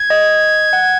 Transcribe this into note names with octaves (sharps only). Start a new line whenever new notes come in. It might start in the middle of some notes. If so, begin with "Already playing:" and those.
Already playing: G#6
D#5
F#5